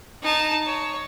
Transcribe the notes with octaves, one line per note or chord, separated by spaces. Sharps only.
D#4 A5
C#5